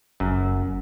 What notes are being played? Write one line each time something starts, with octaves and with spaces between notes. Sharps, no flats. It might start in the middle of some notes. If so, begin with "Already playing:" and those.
F#1 F#2